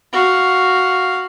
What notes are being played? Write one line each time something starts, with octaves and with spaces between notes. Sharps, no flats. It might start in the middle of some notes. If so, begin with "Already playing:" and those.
F#4 F5